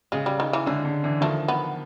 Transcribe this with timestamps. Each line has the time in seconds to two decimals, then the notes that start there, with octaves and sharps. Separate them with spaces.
0.12 C#3 G#3
0.26 G3
0.40 D#3
0.53 E3
0.66 D3 G#3
0.85 D3
1.04 D3 E3
1.21 D#3 F3 A3
1.48 B3